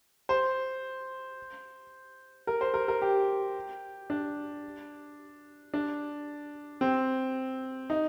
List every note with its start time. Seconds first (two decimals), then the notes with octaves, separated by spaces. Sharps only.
0.29 C5
2.47 A#4
2.61 C5
2.74 A#4
2.88 A#4
3.02 G4
4.10 D4
5.74 D4
6.81 C4
7.90 D#4